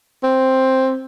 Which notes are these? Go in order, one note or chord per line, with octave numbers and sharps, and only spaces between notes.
C4